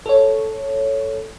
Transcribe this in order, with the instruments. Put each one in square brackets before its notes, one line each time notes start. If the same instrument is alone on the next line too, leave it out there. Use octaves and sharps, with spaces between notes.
[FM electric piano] A4 C#5